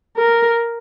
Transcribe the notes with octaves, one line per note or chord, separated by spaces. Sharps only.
A#4